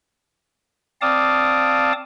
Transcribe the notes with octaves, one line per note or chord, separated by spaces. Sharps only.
C4 D5 F5 A5 D6 D#6